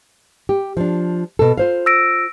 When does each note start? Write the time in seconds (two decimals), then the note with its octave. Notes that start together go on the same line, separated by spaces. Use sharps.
0.49 G4
0.77 F3 D4
1.39 B2 A4
1.58 F4 C5 F5
1.86 E6 A#6 D7